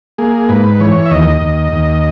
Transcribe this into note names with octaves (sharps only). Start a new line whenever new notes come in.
A#3 G#4
G#2 B4
E3 C#5
E5
D#2 D#5
D#2
D#2